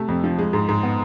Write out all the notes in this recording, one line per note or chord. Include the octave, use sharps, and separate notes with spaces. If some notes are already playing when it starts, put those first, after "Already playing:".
Already playing: C3 A3
F2
F3
G#3
G#2
G#2
B3